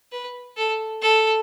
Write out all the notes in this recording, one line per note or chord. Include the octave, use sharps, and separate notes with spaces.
B4
A4
A4